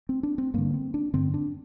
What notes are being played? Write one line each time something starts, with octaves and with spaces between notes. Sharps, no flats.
C4
D4
C4
G2 D3 A#3
C4
D4
G2 D3 C4
D4